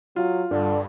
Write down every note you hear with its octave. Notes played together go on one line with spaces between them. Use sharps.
F#3 F4
G2 D3 D5